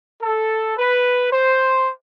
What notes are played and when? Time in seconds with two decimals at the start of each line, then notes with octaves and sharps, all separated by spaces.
0.21 A4
0.77 B4
1.32 C5